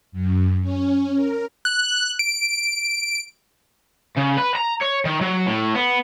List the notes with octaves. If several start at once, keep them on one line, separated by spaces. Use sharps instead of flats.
F#2
C#4
A#4
F#6
D7
C#3
B4
A#5
C#5
D#3
F#3
A2
B3